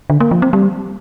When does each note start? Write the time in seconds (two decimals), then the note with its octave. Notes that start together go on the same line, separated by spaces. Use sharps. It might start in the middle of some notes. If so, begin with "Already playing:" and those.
0.10 D3
0.20 A#3
0.31 F3
0.42 C4
0.53 G3